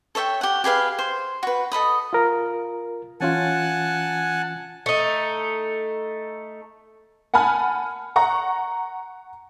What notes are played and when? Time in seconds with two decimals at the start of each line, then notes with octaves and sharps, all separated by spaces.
0.15 A4 C#5 E5 G5
0.41 G4 F#5
0.64 G4 G#4 B4 F5
0.99 C5
1.43 F#4 B4
1.72 A4 D#5 B5 D#6
2.13 F4 A#4
3.20 E3 C#4 F4 F#5 G#5 A5
4.86 A3 D#4
7.34 F#5 G#5 A5 B5 F6
8.16 F#5 A#5 C#6